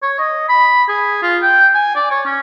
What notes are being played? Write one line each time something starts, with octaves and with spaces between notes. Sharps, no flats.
C#5
D#5
B5
G#4
F4
G5
G#5
D5
C#5
C#4